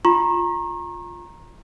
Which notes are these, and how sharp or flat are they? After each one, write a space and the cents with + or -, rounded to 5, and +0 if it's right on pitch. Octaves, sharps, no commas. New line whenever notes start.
F4 +0 A#5 +0 C#6 -40